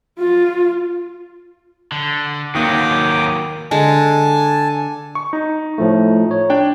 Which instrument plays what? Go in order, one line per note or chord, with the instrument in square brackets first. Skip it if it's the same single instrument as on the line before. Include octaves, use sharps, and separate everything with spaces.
[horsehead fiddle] F4
[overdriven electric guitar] D3
[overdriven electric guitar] D#2 F#3 [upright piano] D#3 A#3 [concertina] G5 D6 D#6
[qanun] D3 G#3 [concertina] G#5 A5
[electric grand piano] C#6
D#4
[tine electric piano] A2 F3 A3
C#5
[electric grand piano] D4 G5